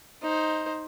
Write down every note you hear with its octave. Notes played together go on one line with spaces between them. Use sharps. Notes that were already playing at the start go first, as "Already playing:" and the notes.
D#4 C5